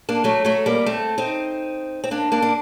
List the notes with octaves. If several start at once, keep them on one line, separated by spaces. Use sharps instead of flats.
A#3 D4
F#3 A3
F#3 A3
G3 A#3
A3 C4
C4 D#4
C4
A#3 D4
A#3 D4
D4